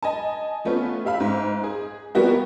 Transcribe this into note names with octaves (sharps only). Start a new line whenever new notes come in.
D#5 G#5 A5
F3 A3 B3 C#4 F4
G4 E5 F5 B5
G#2
G#4
F3 G3 A#3 B3 F#4 G4